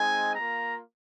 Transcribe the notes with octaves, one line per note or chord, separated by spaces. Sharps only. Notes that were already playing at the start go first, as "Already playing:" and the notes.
Already playing: G#3 C4 D#4 G#5
A#3 F4 A#5